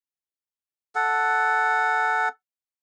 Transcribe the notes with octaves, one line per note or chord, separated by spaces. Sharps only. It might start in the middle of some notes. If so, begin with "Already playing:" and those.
A4 F#5